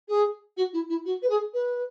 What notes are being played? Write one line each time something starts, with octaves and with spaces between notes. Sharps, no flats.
G#4
F#4
E4
E4
F#4
B4
G#4
B4